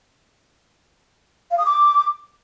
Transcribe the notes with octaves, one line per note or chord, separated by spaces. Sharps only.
F5
D#6
D6